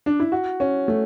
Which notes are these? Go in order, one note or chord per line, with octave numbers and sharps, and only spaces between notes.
D4
E4
F#4
C#4
A3